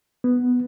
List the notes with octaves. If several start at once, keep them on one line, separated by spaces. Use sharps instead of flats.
B3